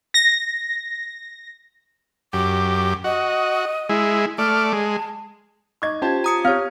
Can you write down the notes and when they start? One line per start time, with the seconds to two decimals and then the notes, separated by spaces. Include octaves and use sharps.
0.14 A#6
2.33 F#2 G4 D6
3.04 F#4 D#5
3.89 G#3 E4
4.38 A3 D5 F6
4.73 G#3 A5
5.82 D#4 D#5 C#6 D6 G#6
6.02 C#4 F4 G4 C5 A5 G#6
6.24 A#5 D#6 C#7
6.45 C4 G4 C#5 F5 F6